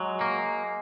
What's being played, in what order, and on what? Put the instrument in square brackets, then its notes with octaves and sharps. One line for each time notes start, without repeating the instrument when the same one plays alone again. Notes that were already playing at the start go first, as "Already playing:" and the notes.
Already playing: [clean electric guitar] F#3 [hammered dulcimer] G#3
[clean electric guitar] A#3